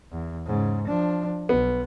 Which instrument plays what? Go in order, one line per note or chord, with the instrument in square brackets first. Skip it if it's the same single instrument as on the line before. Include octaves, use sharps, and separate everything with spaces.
[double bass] E2
G#2 C#3
F3 D4
[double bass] B1 [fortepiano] B3